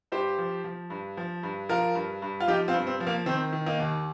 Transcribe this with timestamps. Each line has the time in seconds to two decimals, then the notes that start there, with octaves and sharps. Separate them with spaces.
0.12 G2 G4 C5
0.38 F3
0.64 F3
0.90 G2
1.17 F3
1.43 G2
1.69 F3 F4 A#4
1.95 G2
2.22 G2
2.40 F4
2.47 F3 D#4 G4
2.68 C4 F4
2.74 G2
2.87 C4
3.00 F3
3.07 A#3
3.26 D#3 C4
3.53 D#3
3.66 A#3 D#4
3.80 D#2